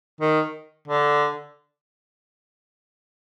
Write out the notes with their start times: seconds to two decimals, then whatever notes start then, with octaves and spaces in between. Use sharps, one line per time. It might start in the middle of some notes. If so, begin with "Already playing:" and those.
0.21 D#3
0.88 D3